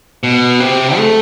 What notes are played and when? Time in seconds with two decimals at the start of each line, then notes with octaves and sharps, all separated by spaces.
0.23 B2
0.60 C3
0.97 A3